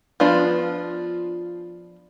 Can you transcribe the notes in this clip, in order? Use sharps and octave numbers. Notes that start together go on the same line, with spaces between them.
F3 B3 D4 F4